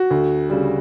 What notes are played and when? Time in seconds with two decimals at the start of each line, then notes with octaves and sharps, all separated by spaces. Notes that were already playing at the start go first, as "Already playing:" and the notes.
Already playing: F#4
0.11 D2
0.50 C#3 G3